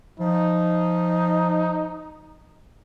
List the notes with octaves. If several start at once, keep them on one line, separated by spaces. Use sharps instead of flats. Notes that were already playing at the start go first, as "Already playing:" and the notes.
F3 D#4